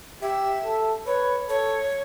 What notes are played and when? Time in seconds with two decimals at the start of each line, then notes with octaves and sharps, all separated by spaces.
0.22 G4 E5
0.64 A4
1.06 B4 C#5
1.49 A4 C#5